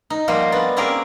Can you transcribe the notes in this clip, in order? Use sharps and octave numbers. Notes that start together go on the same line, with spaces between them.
D#4
F3 G3 A#3 F#4 C5
B3 D4
A#3 C4 C#4 G4 G#4 A#4